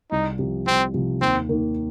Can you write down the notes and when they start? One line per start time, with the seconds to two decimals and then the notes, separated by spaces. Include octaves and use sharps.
0.12 C2 D#4
0.39 C3 F3
0.66 C2 C4
0.94 C3 F3
1.21 D#2 C4
1.49 D#3 A#3 D#4